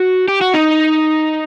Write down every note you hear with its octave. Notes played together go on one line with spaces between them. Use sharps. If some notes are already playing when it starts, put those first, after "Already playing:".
Already playing: F#4
G4
F#4
D#4